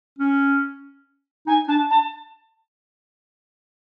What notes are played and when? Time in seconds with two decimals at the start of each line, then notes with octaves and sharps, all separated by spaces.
0.19 C#4
1.47 D#4 G#5
1.68 D4 A5
1.90 A5